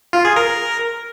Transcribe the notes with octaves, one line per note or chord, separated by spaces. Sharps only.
F4
G#4
A#4